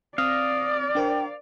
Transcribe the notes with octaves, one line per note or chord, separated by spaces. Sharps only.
C4 D5 F5 D#6 A#6
D4 A#4 C5 G5